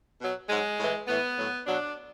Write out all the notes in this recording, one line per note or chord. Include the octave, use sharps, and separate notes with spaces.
B2 F#3
G#2 F#3 G#3
A2 E3
A2 E3 B3
A2 F#3
B2 F#3 D4